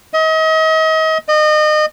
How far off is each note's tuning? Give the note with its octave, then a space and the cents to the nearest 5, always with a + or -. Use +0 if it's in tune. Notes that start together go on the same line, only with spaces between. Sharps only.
D#5 +35
D#5 -30